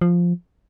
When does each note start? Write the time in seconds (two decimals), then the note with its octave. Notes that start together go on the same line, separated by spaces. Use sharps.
0.01 F3